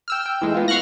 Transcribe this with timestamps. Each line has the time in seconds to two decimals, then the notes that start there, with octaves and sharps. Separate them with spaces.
0.08 G5 E6 F6
0.26 G5
0.41 E3 G#3 A3
0.54 B3 F4
0.68 F5 C#6 F6 F#6 A#6